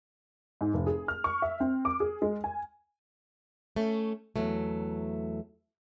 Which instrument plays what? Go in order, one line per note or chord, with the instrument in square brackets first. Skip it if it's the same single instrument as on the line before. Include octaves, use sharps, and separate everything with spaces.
[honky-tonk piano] G#2
F1
G#4
F6
C#6
E5
C4
D6
G#4
G#3
G#5
[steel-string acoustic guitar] A3 C#4
E2 F#3 A3